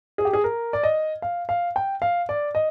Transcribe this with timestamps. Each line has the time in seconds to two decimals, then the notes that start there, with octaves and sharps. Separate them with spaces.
0.18 G#4
0.25 G4
0.33 G#4
0.44 A#4
0.73 D5
0.83 D#5
1.22 F5
1.49 F5
1.76 G5
2.02 F5
2.29 D5
2.55 D#5